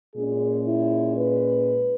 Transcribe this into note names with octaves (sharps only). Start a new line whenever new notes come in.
A#2 G#3 C#4 G#4
E4
B4